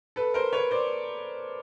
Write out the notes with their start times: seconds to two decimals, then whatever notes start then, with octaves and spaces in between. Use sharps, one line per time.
0.16 A4 B4
0.34 A#4 C5
0.53 B4 C#5
0.71 C5 D5